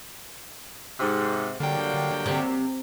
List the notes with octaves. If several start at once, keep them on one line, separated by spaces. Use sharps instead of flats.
G#2 C3
D3 F#3 G3 A#3 G5
C3